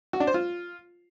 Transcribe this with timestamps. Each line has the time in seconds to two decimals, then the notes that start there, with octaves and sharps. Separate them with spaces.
0.13 F#4
0.20 D4
0.27 C5
0.34 F4